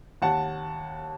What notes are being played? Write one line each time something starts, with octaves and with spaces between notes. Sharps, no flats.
D#2 F#5 A5